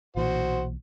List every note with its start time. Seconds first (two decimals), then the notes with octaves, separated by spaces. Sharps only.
0.16 B1 A#2 E3 F#4 C5 F#5